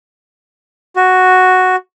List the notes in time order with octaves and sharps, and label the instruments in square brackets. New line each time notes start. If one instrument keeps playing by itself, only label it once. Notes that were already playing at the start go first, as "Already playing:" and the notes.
[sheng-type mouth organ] F#4